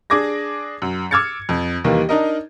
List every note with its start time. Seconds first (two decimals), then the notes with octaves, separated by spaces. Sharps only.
0.10 D4 G#4 D6 G#6 A#6
0.82 F#2
1.11 D6 E6 F6 G#6 A6 C#7
1.49 F2
1.84 D#2 D#3 E3 G3 A#3
2.09 D4 D#4 A#4 D#5